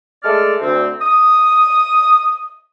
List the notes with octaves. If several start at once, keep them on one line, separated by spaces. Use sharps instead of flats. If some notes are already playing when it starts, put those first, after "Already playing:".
G#3 A3 A4 D5 F6
D2 C4
D#6